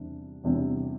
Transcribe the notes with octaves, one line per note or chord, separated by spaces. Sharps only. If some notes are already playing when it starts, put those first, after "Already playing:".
Already playing: E2 C3 G3 D4
E2 C3 G3 D4